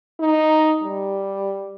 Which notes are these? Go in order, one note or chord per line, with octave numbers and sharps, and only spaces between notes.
D#4
G3